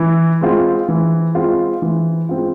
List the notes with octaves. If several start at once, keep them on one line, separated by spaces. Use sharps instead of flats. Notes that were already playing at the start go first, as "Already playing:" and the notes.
Already playing: E3
G#3 C4 F4
E3
G#3 C4 F4
E3
G#3 C4 F4